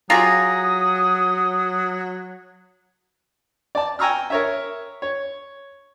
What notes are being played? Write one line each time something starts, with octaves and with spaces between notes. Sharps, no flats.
F#3 F4 G4 G#4 A#5 D#6
D5 A5
G5 G#5 A#5 C#6 E6 F6
A#4 C#5 E5
C#5